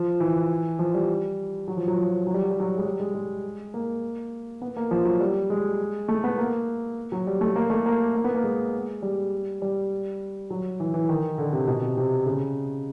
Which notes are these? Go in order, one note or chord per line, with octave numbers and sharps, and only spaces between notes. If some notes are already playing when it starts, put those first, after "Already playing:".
Already playing: F3
E3
F3
G3
F#3
F3
F#3
F3
F#3
G3
F#3
G3
F#3
G#3
G3
G#3
G#3
A#3
B3
A#3
F3
F#3
G3
G#3
A3
B3
A#3
F#3
G3
A3
A#3
A3
A#3
A#3
B3
A#3
G#3
G3
G3
F#3
E3
E3
D#3
D3
C3
B2
C3
C3
C#3